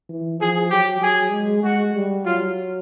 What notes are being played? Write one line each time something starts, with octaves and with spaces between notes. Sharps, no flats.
E3
F3 G#4
F#3 G4
F#3 G#4
G#3
G#3 F#4
G3
F#3 F4